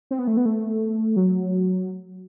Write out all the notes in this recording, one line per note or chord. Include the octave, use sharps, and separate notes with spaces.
C4
B3
A3
B3
A3
F#3